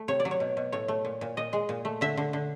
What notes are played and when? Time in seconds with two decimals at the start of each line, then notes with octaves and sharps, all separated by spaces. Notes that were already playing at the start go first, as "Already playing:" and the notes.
Already playing: A3
0.08 C3 C#5
0.20 D5
0.25 F#3
0.31 C#5
0.40 B2
0.57 B2
0.72 A2 C#5
0.88 A3
1.05 A#2
1.21 A#2
1.37 A#2 D#5
1.53 G#3
1.69 A#2
1.85 A3
2.01 D3 E5
2.17 D3
2.33 D3